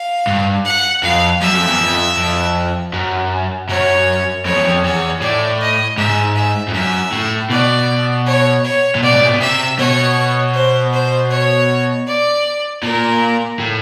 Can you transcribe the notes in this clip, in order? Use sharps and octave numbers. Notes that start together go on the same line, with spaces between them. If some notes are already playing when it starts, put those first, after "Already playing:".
Already playing: F5
G2
F#5
F2 F5
F#2 E5
F2
E2
F2
F2
F#2
F#2 C#5
F2 C#5
E2
F2
E2 C#5
A2 D5
D#5
G#2 E5
E5
F2
F#2 E5
A2
B2 D5
C#5
C#5
A#2
B2 D5
G#2
A2
A#2
B2
C3 E5
B2 C#5
C5
C5
C#5
D5
A#2 A#4
A2